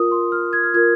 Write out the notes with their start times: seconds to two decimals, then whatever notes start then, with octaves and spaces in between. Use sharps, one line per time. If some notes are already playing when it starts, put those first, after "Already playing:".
Already playing: F4 A#4 D#6
0.11 C6
0.32 F6
0.53 G#6
0.63 F6
0.74 F4 A#4 G#6